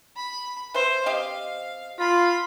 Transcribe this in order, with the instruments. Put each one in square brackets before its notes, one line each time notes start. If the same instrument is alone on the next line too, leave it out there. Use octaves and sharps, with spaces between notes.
[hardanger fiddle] B5
[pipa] B4 E5 C6 [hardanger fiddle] C5
[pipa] C4 G4 D#5 [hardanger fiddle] F5
[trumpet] F4 [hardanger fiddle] B5